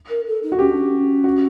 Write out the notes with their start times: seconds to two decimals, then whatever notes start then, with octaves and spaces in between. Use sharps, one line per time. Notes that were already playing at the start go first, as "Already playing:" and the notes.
0.09 A#4
0.27 A4
0.42 D#4
0.52 F#4
0.59 C#4 G4
0.68 D4
0.77 C#4
1.24 F#4